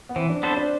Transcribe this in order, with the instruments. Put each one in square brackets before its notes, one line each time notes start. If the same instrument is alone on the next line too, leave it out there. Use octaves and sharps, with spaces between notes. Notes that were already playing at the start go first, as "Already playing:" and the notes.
[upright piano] B3
[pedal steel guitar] E3 [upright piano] C4
[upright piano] D4
[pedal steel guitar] B3 D4 A4 C5 [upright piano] C4
[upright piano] D4